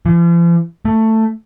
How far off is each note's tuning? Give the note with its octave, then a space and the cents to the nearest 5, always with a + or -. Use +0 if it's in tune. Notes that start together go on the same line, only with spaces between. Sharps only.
F3 -45
A3 +10